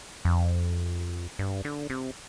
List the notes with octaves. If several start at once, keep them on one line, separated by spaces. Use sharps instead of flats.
F2
G2
D3
C3